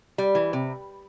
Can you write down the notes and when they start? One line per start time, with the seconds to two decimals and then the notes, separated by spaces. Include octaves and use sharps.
0.18 G3
0.35 E3
0.53 C3